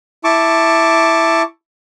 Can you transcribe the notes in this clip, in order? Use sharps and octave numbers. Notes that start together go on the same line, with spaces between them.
E4 A5 C#6 D6